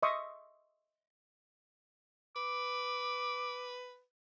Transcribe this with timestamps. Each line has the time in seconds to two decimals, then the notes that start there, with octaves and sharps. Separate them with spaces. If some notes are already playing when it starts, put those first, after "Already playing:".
0.03 D#5 E5 C6 C#6 D#6
2.36 B4 D6